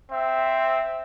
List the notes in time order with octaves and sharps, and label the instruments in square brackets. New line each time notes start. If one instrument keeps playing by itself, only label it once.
[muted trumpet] C4 [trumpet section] E5